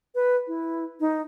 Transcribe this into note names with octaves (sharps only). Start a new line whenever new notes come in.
B4
E4
D#4